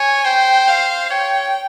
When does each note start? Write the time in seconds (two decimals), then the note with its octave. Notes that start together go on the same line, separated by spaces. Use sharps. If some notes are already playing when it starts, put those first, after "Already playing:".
Already playing: C#5 G#5
0.25 C5 G5
0.68 F5
1.11 C#5 G5